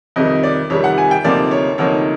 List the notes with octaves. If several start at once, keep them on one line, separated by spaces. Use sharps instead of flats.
F2 C3 D#3 G3 D#5
D5
F2 C3 D#3 G3 C#5
F#5
G#5
G5
D2 C3 F3 A#3 D#4 D5
C#5
D2 C3 F3 A#3 D#4 C#5